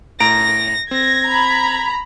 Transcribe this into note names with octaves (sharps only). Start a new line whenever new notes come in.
A2 A#5 A#6 D7
C4 G#6 A#6
A#5 B5